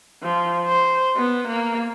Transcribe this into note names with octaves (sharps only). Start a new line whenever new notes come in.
F3
C5
B3
A#3